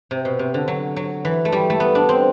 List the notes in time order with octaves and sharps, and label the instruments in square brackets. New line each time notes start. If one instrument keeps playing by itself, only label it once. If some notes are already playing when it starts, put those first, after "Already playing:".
[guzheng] C3
B2
C3
D3
F#3
F#3
E3
A3
G3
A3
B3
D4
C4